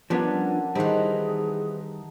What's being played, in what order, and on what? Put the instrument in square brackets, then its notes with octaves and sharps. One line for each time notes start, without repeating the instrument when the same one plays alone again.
[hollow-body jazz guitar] F3 B3 C#4 [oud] G3 D4 [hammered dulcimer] A4 A#4 F#5
[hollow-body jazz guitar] D#3 G3 [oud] E3 C4 [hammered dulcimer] D#4 [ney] G#4